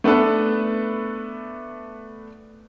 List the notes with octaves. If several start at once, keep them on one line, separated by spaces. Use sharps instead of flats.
A3 B3 D4 A4 B4